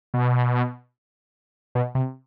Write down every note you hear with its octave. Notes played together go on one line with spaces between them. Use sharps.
B2
B2
C3